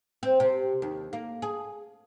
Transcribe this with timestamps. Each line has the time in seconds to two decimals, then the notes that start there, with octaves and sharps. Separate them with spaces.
0.23 C4
0.40 C3
0.82 D#2
1.13 A#3
1.42 G#4